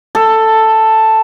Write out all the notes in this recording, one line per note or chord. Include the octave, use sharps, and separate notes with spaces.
A4